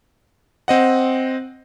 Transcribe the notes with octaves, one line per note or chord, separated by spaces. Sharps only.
C4 D#5 F#5